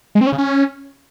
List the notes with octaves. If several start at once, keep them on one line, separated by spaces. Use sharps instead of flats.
G#3
C4
C#4
C#3
C#4